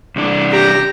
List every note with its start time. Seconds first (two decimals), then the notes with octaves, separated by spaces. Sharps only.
0.16 C2 D4
0.51 G4 A#5